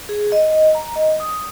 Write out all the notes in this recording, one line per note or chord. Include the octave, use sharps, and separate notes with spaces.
G#4
D#5
A#5
D#5
D#6